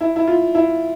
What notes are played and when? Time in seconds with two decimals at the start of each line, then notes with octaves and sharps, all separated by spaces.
0.01 E4
0.16 E4
0.28 F4
0.55 E4